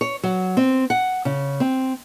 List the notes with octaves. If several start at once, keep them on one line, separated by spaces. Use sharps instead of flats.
C#5
F#3
C4
F#5
C#3
C4